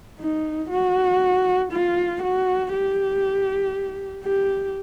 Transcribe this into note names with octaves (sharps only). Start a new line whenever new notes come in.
D#4
F#4
F4
F#4
G4
G4